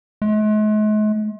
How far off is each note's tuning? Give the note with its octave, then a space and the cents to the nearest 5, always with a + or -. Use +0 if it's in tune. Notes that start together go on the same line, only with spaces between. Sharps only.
G#3 +45